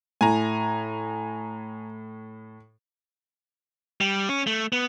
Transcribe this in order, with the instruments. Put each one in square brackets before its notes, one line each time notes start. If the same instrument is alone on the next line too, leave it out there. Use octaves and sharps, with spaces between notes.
[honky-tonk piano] A2 [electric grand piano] G#5 A#5
[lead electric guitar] G3
C#4
A3
B3